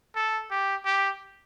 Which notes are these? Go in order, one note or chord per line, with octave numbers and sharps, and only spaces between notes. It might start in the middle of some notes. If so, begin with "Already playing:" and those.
A4
G4
G4